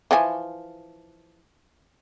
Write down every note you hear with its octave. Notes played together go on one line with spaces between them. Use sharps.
E3 F3 G#5